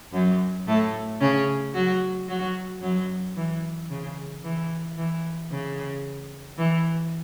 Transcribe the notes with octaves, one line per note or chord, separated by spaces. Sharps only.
F#2 F#3
A2 A3
C#3 C#4
F#3 F#4
F#3 F#4
F#2 F#3
E3
C#3
E3
E3
C#3
E3